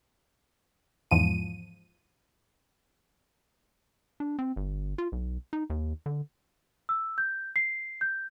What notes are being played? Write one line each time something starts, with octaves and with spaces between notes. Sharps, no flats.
E2 G#2 F3 D#7
D4
C4
G1
F4
B1
D#4
D#2
D3
E6
G6
C7
G6